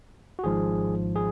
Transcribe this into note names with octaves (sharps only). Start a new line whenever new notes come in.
F#4
G#1 G#2 F3 G#4
G#4